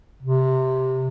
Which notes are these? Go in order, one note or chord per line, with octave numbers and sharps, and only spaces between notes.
C3